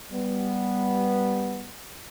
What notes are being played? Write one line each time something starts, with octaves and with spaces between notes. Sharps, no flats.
G3 B3